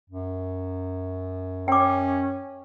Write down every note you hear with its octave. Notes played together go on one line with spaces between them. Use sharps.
F#2
C#4 G5 D6